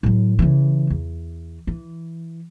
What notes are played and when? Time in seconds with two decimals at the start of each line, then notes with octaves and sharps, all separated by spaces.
0.03 A2 F#3
0.39 C#3 E3
0.90 E2
1.67 E3